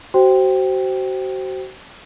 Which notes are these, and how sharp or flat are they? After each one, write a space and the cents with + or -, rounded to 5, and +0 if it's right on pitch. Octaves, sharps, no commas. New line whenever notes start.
F#4 +35 C5 +0 G5 +0